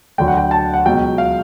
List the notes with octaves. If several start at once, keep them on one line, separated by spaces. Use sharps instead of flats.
D2 D3 F#3 G5
F#5
G5
A5
F#5
C#2 B2 F#3 G5
F5